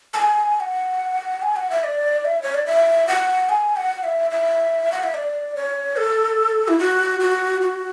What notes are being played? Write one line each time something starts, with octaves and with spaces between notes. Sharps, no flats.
A5
G#5
F#5
G#5
F#5
E5
D5
E5
C#5
D5
E5
F#5
G#5
F#5
E5
E5
F#5
E5
D5
C#5
A4
E4
F#4
F#4
F#4